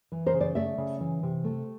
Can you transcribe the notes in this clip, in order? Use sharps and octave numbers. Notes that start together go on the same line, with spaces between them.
E3
A#4 C5
C#3
C5 D5
A3 D5 E5
C#3
E3
C3
A3